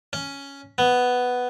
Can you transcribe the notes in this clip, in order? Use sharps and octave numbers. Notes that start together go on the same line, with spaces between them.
C#4
B3